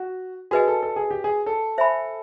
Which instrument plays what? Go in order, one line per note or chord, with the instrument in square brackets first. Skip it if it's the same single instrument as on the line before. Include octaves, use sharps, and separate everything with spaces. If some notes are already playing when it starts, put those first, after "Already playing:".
Already playing: [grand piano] F#4
[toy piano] F#4 B4 D#5 G#5 [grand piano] G#4
[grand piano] A4
A4
G#4
G4
G#4
A4
[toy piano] C5 E5 G#5 B5